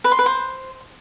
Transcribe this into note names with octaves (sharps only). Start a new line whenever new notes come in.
B4
C6
B4
C5